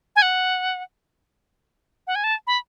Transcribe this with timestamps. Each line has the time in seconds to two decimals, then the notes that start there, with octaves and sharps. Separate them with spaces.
0.16 G#5
0.22 F#5
2.07 F#5
2.15 G#5
2.24 A5
2.47 B5